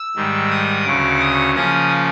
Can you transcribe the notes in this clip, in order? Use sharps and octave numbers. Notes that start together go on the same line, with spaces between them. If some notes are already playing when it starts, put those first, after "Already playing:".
Already playing: E6
G#2 D#3 G3
D#6
D2 C#3 F#3 D6
D#6
C#3 F3 A#3 C#4 D#6